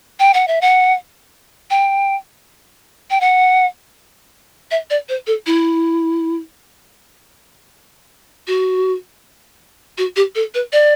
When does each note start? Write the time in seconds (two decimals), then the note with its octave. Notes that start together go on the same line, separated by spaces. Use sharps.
0.20 G5
0.34 F#5
0.48 E5
0.61 F#5
1.70 G5
3.11 G5
3.21 F#5
4.71 E5
4.90 D5
5.09 C5
5.27 A4
5.46 E4
8.47 F#4
9.98 F#4
10.16 G4
10.35 A4
10.55 B4
10.73 D5